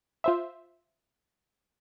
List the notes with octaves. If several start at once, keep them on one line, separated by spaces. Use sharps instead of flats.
F4 C5 E5